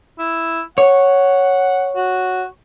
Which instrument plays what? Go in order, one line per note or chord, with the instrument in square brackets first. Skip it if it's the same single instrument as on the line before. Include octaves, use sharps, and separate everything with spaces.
[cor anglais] E4
[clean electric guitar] C#5 [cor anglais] F#5
[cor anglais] F#4